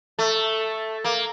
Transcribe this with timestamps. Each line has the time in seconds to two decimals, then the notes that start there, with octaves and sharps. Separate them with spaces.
0.19 A3
1.04 A#3